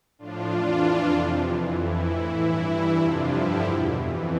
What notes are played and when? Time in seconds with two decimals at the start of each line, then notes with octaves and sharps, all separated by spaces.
0.19 A2 F3 D4 F4
0.50 F2 E3
0.81 F2 E3
1.13 F2 C3 F3
1.44 F2 E3
1.75 F2 E3 E4
2.07 A2 E3 E4
2.39 G2 E3
2.69 G2 E3 E4
3.01 F2 C3 F3 D4 F4
3.32 G2 D3 F3 E4 G4
3.65 E2 B2
3.97 F2 E3